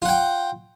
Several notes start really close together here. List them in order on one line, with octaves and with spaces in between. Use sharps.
F4 F#5 G5